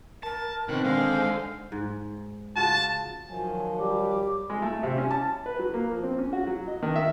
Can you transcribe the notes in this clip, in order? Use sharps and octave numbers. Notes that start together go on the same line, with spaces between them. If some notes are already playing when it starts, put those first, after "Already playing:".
A#4 A5
B2 D#3 C4 F#6
D3 G#3 C5 F5
G#2
C#3 F4 F#4 A5
D#3 F3 F#3 G#5
G3 D6
G#3
A3
C3
C#4
A5
B4
F#3
A#3
F3
C4
C#4
F#4
F#3
D#5
D#3
E5